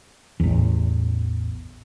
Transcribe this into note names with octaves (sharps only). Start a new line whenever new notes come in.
A1 E2